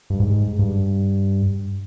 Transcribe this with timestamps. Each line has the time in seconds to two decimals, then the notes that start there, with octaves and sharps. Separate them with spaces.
0.10 G2
0.20 G#2
0.59 G2